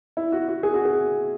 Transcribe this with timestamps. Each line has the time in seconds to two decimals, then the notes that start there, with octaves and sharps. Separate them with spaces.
0.17 E4
0.32 F#4
0.48 F#4
0.63 G#4
0.74 F#4
0.85 G#4